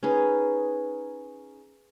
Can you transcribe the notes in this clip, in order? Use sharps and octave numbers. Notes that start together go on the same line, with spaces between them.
C#4 D#4 G#4 B4